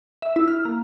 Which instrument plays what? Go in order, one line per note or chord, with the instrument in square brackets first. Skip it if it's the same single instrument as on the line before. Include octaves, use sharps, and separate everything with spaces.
[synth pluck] E5
E4
F6
A#3